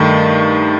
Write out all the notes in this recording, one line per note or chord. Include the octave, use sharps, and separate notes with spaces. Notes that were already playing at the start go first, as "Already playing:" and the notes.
Already playing: G2 D#3 A3